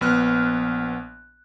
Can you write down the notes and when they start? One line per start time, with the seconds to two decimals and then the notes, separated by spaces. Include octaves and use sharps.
0.01 A#1 B3 F6 F#6